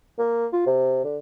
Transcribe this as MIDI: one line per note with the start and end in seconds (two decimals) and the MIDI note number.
0.19 0.47 58
0.53 0.63 65
0.66 1.01 48
1.04 1.17 50